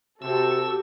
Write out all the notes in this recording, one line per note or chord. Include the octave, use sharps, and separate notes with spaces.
C3 F#4 G4 A4 E6